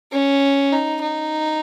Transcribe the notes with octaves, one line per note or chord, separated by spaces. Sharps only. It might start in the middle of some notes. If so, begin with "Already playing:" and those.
C#4
D#4
D#4